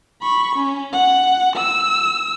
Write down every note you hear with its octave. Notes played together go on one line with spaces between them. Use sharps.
B5 C#6
C#4
F#5
E6